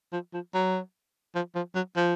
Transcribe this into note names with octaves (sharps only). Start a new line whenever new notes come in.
F3
F3
F#3
F3
F3
F#3
F3